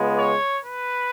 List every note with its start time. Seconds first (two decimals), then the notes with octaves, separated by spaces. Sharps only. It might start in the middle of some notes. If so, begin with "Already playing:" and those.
Already playing: C#2 C#3 G#3 B3
0.17 C#5
0.63 B4